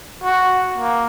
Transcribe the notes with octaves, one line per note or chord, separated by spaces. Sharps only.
F#4
A#3